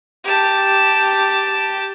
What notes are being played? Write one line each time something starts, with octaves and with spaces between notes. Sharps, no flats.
G4 A5